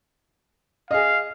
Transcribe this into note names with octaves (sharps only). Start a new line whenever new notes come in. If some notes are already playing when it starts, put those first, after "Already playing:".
G#4 D#5 F5